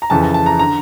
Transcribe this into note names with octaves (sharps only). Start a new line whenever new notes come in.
A#5
F2 C#3 E3 A5
A5
A5
A#5
D3 A#5